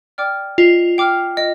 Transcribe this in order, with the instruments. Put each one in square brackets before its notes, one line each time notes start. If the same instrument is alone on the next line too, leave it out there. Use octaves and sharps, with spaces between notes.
[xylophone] D5 G5 D6 F6
[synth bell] F4 [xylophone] D#5
[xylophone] G5 D6 F6
D#5